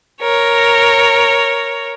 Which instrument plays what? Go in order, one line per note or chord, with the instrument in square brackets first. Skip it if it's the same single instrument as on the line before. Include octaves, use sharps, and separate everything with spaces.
[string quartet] A#4 C#5